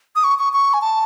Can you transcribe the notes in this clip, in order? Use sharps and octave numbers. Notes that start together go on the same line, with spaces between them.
D#6
C#6
C#6
C#6
G#5
A5